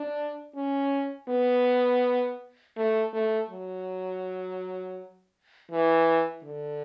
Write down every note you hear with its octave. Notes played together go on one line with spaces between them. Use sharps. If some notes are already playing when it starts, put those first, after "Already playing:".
Already playing: D4
C#4
B3
A3
A3
F#3
E3
D3